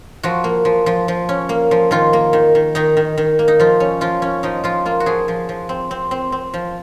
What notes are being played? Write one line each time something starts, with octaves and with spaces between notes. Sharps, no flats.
F3 F#4
A#3
F3
F3
F3
C#4
A#3
F3
D#3 F4
A#3
D#3
D#3
D#3 D#4
D#3
D#3
A#3
D#4
F3 F4
C#4
F3 F4
C#4
F3 D#4
F3 F4
A#3 F4
F#4
F3 G#4
F3
F3
C4
C4
C4
C4
F3